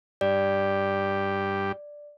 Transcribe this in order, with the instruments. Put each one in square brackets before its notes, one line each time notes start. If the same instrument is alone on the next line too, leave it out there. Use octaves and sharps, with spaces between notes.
[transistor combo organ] G2 G4 [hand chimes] D5